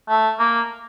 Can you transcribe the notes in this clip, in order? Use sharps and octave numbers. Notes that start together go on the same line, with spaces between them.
A3
A#3